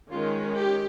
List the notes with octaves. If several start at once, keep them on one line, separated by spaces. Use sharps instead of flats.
D#3 G#3 C#4 F4
G4